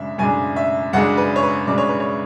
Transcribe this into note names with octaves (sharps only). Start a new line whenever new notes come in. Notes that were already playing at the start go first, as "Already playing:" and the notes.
Already playing: F#2 C#3 G#3 D4 E5
F#2 C#3 G#3 D4 G#5
E5
F#2 C#3 G#3 D4 F#5
B4
C#5
B4
F#2 C#3 G#3 D4 D5
C#5
B4
C#5